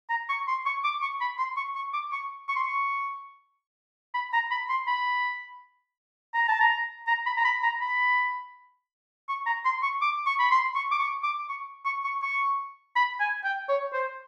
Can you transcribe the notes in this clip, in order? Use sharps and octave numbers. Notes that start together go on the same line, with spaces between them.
A#5
C#6
C6
C#6
D6
C#6
B5
C6
C#6
C#6
D6
C#6
C#6
C6
C#6
B5
A#5
B5
C6
B5
A#5
A5
A#5
A#5
B5
A#5
B5
A#5
B5
C#6
A#5
C6
C#6
D6
C#6
B5
C6
C#6
D6
C#6
D6
C#6
C#6
C#6
C#6
B5
G#5
G5
C#5
C5